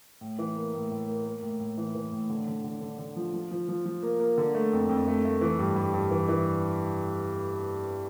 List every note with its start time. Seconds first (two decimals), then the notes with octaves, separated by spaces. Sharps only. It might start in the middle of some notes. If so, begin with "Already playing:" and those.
0.21 A2
0.39 E3
0.56 A#3
0.74 A2
0.91 A2
1.08 A#3
1.26 A#3
1.42 A2
1.60 A2
1.78 E3
1.95 E3
2.12 A2
2.30 D3
2.48 D3
2.64 D3
2.81 D3
2.98 D3
3.16 F3
3.34 F3
3.51 F3
3.69 F3
3.86 F3
4.03 A#3
4.20 A#3
4.38 D3
4.55 A3
4.73 F2
4.89 F2
5.07 A3
5.25 A3
5.41 E3
5.59 G2
5.76 G2
5.94 G2
6.11 E3
6.29 E3